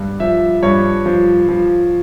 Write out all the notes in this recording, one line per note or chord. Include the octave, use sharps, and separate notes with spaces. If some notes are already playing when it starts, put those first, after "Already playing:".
Already playing: G2
F3 E5
G2 C#5
F3
F3